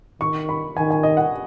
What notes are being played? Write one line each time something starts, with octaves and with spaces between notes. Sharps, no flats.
D#3 C#6
B5
D#3 G#5
G#5
D#5
F#5